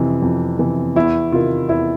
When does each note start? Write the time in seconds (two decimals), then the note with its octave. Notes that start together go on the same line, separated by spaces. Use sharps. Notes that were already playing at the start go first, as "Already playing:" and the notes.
Already playing: F2 C3 E3
0.22 F2
0.59 C3 E3
0.96 E2 E4
1.32 C3 D#3 F4
1.69 E2 E4